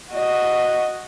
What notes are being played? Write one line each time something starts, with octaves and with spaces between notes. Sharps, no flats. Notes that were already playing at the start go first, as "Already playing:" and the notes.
F#4 D#5